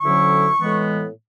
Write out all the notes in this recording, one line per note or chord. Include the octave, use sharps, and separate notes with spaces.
D2 D3 F#3 C#4 E4 C#6
A2 E3 G#3 B3